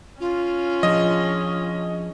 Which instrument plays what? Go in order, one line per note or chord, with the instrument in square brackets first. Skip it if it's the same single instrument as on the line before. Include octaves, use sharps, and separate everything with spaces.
[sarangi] C#4 [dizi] F4
[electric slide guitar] F3 D4 G#4 [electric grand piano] D#5